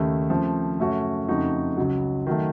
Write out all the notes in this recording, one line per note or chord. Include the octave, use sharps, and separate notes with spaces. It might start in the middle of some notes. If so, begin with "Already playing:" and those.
Already playing: D#2 C#3 A3
C#3 F3 A3 C4
F#2 C#3 A3 C#4 F#4
F2 C#3 A3 D#4 F#4
C#2 C#3 F#3
D#3 F#3 A3